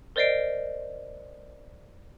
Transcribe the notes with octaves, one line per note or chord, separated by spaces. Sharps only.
A#4 C5 D5 D#5 C7 D7